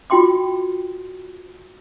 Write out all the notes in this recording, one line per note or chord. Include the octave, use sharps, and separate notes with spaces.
F4 F#4 G5 C6 D6